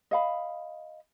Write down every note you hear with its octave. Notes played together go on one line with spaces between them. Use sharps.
D#5 F5 B5